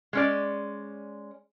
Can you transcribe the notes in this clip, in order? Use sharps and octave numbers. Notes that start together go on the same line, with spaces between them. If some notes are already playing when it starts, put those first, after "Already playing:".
G#3 C#4 D5